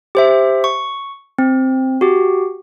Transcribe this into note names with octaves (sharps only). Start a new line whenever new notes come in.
G4 C5 E5
C#6
C4
F#4 G4